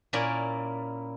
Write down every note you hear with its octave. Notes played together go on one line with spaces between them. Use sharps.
A#2 A#3 C#4 E4 A#4 D5